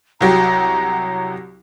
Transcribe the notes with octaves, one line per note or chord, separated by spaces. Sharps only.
C2 F#3 G4 A#5